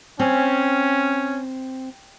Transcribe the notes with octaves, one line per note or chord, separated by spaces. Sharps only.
C4 C#4